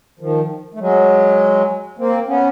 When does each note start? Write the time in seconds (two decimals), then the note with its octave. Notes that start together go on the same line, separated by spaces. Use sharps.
0.19 D#3 F3
0.74 A3
0.80 F#3 G#3
1.98 A#3 C4
2.28 B3 C#4